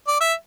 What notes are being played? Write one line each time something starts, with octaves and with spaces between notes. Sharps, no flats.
D5
E5